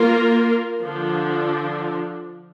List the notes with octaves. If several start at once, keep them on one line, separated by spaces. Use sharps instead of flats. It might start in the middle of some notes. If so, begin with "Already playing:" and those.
Already playing: A#3 F4 A#4
D3 F3 D4